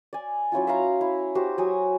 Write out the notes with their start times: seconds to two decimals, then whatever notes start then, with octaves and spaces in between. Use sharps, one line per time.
0.13 D5 G#5
0.52 F#3 C#4 E4 F4
0.67 E5 F5 A#5
1.01 E4
1.35 F#4 G4 C5
1.58 F#3 G#5 D#6